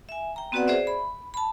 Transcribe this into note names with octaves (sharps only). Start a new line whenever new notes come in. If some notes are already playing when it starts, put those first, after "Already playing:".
E5 G#5
G5 A#5
B3 C4 F#4 B4 D5 F#5
G#4 C5 D5 E5
B5
A5 B5